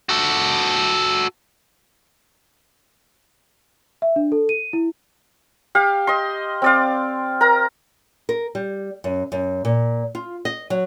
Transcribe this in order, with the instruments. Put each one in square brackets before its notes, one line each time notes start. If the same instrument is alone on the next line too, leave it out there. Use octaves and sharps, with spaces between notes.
[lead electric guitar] F#4 A4
[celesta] E5
D4
A4
D#7
E4
[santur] G4 F5
D#5 C6
C4 D5 F5
A#4 A#5
[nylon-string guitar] A#4
G3
F#2
F#2
A#2
F4
D#5
F#3